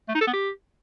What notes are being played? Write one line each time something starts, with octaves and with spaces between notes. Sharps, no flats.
A3
D#4
A4
B3
G4